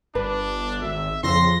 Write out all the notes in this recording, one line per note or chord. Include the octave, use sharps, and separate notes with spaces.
G1 D4 B4
G#1 E5
F2 C#3 C6 A#6